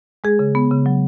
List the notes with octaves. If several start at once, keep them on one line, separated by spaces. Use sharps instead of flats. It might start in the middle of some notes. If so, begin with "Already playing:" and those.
G#3 G#4
C#3
B3
C#3
F#3